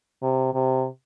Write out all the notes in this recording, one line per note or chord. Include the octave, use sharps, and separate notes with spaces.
C3
C3